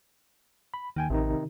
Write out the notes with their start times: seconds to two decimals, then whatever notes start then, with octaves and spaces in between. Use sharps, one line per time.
0.74 B5
0.96 D#2 D#3 G5 G#5
1.10 A1 C3 D#3 D#4